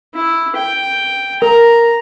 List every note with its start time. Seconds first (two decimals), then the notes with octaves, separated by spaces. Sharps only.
0.14 E4
0.56 G5
1.42 A#4 A#5